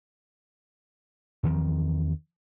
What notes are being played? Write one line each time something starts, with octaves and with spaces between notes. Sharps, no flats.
E2 D#3 F3 C4